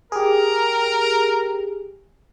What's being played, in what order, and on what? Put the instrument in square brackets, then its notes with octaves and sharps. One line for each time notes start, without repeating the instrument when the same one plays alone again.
[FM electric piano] G4 G#4 [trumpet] A#4